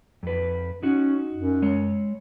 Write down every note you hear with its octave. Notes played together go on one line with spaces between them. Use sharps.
F2 B4
C#4 D#4 F#4
F#2
G#3 C#5